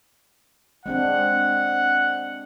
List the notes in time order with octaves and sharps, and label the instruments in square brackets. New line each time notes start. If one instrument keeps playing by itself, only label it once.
[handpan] G#3 C4 D4 [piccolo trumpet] F#5